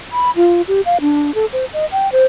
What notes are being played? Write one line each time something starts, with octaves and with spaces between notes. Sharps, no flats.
B5
F4
G4
F5
D4
A4
C5
D#5
G5
C5